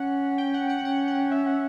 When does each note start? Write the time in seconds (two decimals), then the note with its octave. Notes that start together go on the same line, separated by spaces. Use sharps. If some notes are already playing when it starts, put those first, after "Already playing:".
Already playing: C#4 F#5
0.38 G5
0.54 F#5
0.69 F#5
0.85 C#4 F#5
1.08 F#5
1.31 E5
1.46 F#5